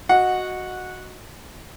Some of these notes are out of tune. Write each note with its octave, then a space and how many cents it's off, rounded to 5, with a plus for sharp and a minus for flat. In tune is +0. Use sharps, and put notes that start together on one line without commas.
F#4 -5 D#5 +0 F#5 -15